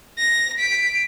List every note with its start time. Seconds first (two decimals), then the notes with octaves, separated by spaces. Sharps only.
0.19 A#6
0.59 B6 D7